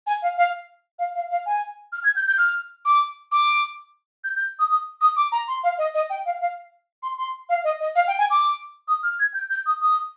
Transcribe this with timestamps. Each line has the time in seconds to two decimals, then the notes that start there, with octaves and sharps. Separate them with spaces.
0.07 G#5
0.22 F5
0.38 F5
0.99 F5
1.15 F5
1.30 F5
1.46 G#5
1.92 F6
2.04 G#6
2.16 G6
2.27 G6
2.38 F6
2.85 D6
3.32 D6
4.24 G6
4.36 G6
4.59 D#6
4.70 D#6
5.01 D#6
5.17 D6
5.32 A#5
5.48 C6
5.63 F5
5.78 D#5
5.94 D#5
6.10 G5
6.26 F5
6.41 F5
7.03 C6
7.18 C6
7.49 F5
7.64 D#5
7.80 D#5
7.95 F5
8.07 G5
8.18 G#5
8.30 D6
8.88 D#6
9.03 F6
9.19 G#6
9.34 G6
9.50 G6
9.66 D#6
9.81 D#6